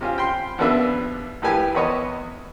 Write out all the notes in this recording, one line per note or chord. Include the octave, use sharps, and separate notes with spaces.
C3 C#4 F4
G5 B5 C6
A#1 D#2 B3 D4 B4 E5
A#1 A2 G4 B4 G#5
E2 B4 C#5 D#5